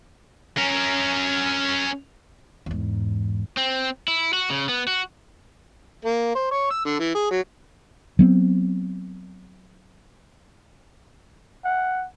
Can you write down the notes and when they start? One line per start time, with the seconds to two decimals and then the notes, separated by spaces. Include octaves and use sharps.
0.58 C#4 A#4
2.66 E2 G#2
3.57 C4
4.08 E4
4.33 F#4
4.50 C#3
4.69 B3
4.88 F#4
6.05 A#3
6.35 C5
6.51 C#5
6.70 E6
6.85 D3
6.99 E3
7.15 G#4
7.31 F#3
8.19 F#3 B3 C4
11.65 F#5